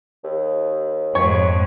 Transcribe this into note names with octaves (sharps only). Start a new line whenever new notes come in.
D#2
F2 G#2 C#5